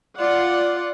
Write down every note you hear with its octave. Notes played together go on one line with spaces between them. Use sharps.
F4 D5 F#5